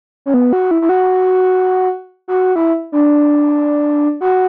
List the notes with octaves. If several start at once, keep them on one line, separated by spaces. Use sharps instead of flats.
C#4
B3
F#4
E4
E4
F#4
F#4
E4
D4
F#4